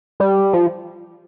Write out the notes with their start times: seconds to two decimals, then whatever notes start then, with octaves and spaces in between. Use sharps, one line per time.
0.20 G3
0.53 F3